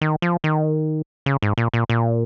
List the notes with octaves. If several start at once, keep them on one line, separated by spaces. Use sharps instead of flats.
D#3
F3
D#3
C#3
G#2
A#2
A#2
A#2